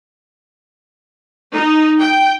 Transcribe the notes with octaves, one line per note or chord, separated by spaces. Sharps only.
D#4
G5